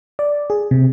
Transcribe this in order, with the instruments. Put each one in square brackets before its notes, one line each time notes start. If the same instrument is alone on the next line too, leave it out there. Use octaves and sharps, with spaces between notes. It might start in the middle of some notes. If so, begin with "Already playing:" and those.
[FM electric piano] D5
G#4
C3